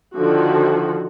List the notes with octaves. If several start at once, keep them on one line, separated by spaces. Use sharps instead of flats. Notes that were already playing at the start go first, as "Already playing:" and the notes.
D3 D#3 F3 F#4